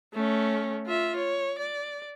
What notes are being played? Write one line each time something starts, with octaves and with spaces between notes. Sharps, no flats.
A3 C#4
F4 E5
C#5
D5